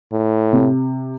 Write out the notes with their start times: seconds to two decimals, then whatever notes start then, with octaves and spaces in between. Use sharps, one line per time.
0.13 A2
0.53 C3